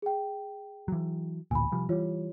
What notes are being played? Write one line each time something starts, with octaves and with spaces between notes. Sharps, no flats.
G#4 G5
E3 F#3
A1 D2 A#2 G#5 B5
C3 F3 G3
E3 G3 F4 C#5